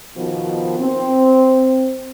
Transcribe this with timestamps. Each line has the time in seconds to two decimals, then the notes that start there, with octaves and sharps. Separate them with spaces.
0.15 B2 D#3 F3
0.80 C4